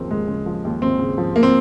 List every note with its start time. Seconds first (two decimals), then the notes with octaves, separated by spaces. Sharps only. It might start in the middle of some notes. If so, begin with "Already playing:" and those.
Already playing: D#2 C#3 F3 A#3 C4
0.11 D#2 G#3
0.28 C#3
0.46 F3
0.65 D#2
0.81 D#2 C4
0.99 C#3
1.18 F3
1.36 A#3
1.43 C4